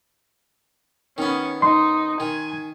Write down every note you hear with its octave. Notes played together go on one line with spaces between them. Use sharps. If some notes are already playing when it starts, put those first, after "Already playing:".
D#3 B3 C#4
D#4 C6
D#3 G#5